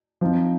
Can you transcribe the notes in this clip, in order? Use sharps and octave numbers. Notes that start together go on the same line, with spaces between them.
F3 C4 D#4